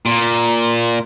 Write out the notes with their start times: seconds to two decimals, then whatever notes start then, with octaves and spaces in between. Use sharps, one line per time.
0.06 A#2